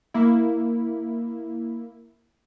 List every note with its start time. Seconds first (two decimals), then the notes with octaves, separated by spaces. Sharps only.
0.14 A#3 E4